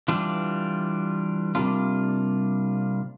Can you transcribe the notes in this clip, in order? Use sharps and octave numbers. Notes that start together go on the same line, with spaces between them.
E3 G3 D4 F4
C3 G3 A#3 D4 F4